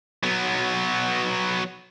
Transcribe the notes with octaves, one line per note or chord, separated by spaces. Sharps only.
F#3 B3